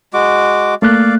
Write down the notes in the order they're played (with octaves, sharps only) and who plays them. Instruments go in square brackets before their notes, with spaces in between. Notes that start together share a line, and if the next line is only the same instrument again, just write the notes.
[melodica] G#3 F#4 D6
[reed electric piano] A3 A#3 F#6 [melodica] D5 F5